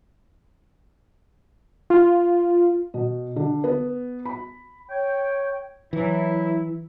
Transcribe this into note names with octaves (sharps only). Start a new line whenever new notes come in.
F4
B2
D3
B3
B5
C#5 G5
E3 F#3 E4